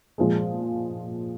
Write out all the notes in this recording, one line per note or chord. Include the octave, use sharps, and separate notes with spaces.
A#2 F3 G#3